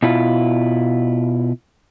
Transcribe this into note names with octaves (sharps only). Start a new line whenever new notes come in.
B2 E4 F4